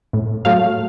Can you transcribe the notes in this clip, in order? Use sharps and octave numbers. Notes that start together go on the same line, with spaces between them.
A2
F#3 A3 F5